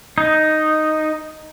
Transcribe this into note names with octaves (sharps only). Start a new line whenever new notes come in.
D#4